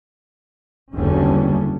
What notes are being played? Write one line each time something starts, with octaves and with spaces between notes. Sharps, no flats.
F#1 B1 E2 D3 G3 C#4